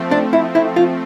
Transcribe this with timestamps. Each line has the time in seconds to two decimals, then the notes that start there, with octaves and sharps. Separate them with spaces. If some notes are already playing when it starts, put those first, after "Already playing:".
Already playing: F3 A3 C4
0.11 D4
0.33 E4
0.55 E4
0.76 F4